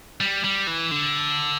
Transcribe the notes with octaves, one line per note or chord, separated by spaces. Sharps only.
G3
G3
E3
D3